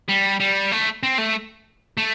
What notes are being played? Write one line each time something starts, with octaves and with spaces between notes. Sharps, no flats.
G3
G3
A3
C4
A3
A3